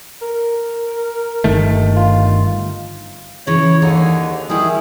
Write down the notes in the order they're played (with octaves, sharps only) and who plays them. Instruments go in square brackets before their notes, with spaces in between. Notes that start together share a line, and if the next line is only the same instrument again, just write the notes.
[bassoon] A#4
[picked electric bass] G1 D#3 A3
[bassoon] F4
[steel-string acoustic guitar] C#3 E3 [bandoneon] C#5
[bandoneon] D#2 D3 [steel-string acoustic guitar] D#4 G#4
[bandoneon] D#3 G#4 [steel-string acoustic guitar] G3 E4